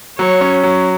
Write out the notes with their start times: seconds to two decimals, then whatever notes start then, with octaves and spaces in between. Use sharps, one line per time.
0.18 F#3 C#5
0.41 C#4
0.63 F#3